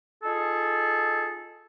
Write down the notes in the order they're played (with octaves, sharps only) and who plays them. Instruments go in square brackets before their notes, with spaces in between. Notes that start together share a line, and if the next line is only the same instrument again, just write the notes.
[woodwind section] D#4 F4 G#4 A4